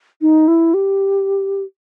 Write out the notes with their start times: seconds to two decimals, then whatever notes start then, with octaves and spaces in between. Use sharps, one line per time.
0.21 D#4
0.48 E4
0.74 G4